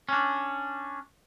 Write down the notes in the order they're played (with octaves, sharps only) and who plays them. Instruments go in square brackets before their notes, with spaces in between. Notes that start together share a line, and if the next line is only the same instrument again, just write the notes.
[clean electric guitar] C#4 D4